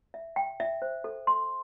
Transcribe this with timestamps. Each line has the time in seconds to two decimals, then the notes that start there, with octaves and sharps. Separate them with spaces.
0.14 E5
0.36 G5
0.60 E5
0.82 C5
1.04 A4
1.27 C6